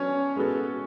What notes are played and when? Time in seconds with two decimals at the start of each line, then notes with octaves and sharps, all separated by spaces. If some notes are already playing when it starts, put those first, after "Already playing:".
Already playing: F#3 B3 C#4 D4 C#5
0.36 G#3 B3 F#4 A4